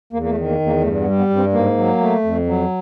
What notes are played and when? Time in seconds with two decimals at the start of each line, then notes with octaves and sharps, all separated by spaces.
0.13 E2 A#3
0.23 A#3
0.31 A3
0.37 D#3
0.48 A#3
0.60 E2
0.66 A#3
0.83 G2 A3
1.01 B3
1.07 G3
1.19 B3
1.30 G2
1.36 C4
1.53 G#2 A#3
1.77 F#3
2.01 A3
2.24 F2
2.47 F#3